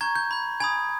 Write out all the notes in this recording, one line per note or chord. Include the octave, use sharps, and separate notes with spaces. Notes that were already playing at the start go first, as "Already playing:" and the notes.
A#5 C#6 G6 G#6
G6
B5 G6
G#5 B5 D#6 G#6